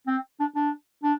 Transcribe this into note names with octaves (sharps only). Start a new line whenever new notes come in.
C4
D4
D4
D4